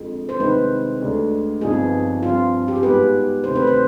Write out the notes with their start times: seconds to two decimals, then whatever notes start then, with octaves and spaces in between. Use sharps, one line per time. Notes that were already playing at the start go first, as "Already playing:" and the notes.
Already playing: F2 D3 G#3
0.29 C5
0.39 C2 C3 D#3 G#3 C4 B4
1.01 D2 D3 G#3 D4
1.61 G1 G2 F3 C4 D#4 G#4
2.22 G2 F3 C4 F4
2.68 G4
2.76 G#4
2.83 G#2 G3 B3 B4
3.44 D2 C3 D#3 C5
3.56 B4
3.67 C5